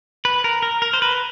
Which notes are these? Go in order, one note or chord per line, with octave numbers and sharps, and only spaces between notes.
B4
A#4
A#4
A#4
C5
B4